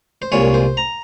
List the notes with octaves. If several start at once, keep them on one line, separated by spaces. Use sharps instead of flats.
C5
C2 A#2 G#3 C#5
C5
A#5